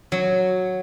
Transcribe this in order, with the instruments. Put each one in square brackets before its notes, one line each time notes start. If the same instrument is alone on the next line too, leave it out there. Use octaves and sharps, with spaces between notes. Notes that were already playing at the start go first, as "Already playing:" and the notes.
[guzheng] F#3